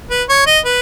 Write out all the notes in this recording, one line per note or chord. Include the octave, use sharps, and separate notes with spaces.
B4
C#5
D#5
B4